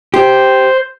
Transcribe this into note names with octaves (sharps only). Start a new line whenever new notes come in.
G4 C5